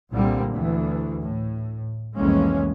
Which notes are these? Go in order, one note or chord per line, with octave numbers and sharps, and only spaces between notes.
C2 A#2 D3 G3 A#3 C4
D2 E3
A2
C2 F2 E3 G#3 A#3 C#4